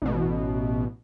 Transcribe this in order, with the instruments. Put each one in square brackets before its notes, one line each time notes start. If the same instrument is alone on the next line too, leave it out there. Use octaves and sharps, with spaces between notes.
[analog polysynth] A1 B2